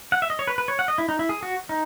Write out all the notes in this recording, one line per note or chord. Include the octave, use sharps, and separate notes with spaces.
F#5
E5
D#5
C#5
B4
B4
C#5
F#5
D#5
E4
D#4
E4
G#4
F#4
D#4